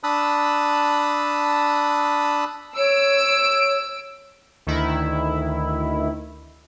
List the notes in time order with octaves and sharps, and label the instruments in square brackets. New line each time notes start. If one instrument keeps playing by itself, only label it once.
[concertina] D4 A5 B5 D#6 E6 F#6
[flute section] C#5 [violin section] E6 D7
[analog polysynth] D2 D#3 E4